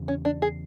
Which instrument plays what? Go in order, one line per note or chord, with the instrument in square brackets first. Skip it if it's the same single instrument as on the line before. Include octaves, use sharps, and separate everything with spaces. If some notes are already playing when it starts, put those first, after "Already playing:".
Already playing: [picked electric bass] E2 C#3
[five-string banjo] C#4
D4
G#4